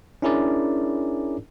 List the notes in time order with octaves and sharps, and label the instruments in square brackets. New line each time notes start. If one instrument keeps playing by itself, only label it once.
[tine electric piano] C#4 D4 E4 G#4 A#4 D5